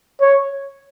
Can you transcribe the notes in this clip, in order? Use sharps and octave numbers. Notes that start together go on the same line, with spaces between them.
C#5